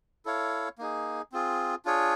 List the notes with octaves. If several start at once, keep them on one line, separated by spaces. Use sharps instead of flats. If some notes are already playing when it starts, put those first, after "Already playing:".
E4 A4 C#5 F5
A#3 D#4 G#4
C4 F4 G#4
D4 F4 G#4 C#5